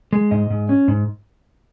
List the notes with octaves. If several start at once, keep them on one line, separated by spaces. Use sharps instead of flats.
G#3
G#2 D#5
G#2
C#4
G#2